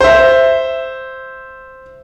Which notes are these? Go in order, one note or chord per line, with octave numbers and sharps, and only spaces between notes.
C5 E5